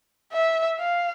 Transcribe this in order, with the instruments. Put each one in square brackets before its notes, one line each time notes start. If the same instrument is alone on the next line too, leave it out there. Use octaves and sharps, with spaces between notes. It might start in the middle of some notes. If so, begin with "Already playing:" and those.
[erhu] E5
F5